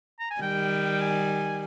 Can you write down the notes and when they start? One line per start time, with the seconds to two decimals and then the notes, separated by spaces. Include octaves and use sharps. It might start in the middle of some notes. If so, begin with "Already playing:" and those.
0.19 A#5
0.31 G#5
0.41 D#3 G3 G5
1.01 G#5